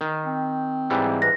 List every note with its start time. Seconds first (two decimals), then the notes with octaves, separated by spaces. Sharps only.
0.01 D#3
0.26 C4
0.90 G#2 E3 G3
1.22 B4 A#6